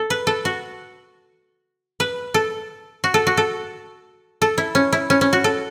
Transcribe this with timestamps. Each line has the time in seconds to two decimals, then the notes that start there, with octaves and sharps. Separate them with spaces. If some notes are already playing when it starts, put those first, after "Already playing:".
Already playing: A4
0.10 B4
0.27 A4
0.45 F#4
2.00 B4
2.34 A4
3.04 F#4
3.14 A4
3.27 F#4
3.37 A4
4.42 A4
4.58 E4
4.75 C#4
4.93 E4
5.10 C#4
5.21 C#4
5.33 F#4
5.44 A4